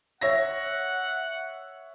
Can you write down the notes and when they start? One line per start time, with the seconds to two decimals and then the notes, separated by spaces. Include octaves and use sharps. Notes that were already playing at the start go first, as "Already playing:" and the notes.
0.21 C#5 E5 F#5 A#6